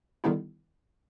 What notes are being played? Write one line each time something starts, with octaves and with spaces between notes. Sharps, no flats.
D3 D#3 G3 B3 D#4 E4